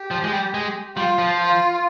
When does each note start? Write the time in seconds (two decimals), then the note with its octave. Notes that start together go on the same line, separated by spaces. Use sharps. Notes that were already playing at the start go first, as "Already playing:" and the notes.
Already playing: G4
0.11 F3
0.24 G#3
0.33 G3
0.54 G#3
0.97 G3 F4
1.18 F3
1.40 F4